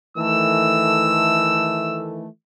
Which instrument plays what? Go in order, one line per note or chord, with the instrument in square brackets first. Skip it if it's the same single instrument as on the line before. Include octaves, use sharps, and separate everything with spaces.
[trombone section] D#3 E3 A3 [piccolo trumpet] E6